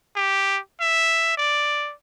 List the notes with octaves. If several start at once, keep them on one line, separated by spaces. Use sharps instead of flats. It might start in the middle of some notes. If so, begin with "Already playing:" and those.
G4
E5
D5